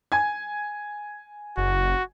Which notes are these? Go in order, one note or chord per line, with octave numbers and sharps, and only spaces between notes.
G#5 G#6
F#1 F#4